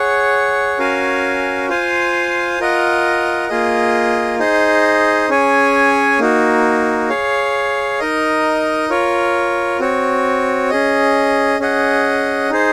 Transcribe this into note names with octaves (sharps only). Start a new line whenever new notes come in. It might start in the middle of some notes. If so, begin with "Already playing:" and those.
Already playing: G#4 C#5 F#5
C#4 F#4 A#4 F5 G#5
F4 C5 F5 G#5
F4 A#4 D#5 F#5
A#3 F4 G#4 D#5
D#4 G#4 C5 D#5
C#4 G#4 C#5 G#5
A#3 D#4 F#4
G#4 C#5 F5
D#4 A#4 D#5
F4 A#4 C#5
C4 F#4 C#5
C#4 G#4 D#5
C#4 G#4 D#5 F#5
D#4 G#4 C5